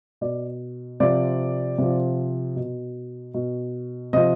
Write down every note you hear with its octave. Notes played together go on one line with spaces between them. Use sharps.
B2 D5
C3 F3 D5
C3 F3
B2
B2
C3 F3 D#5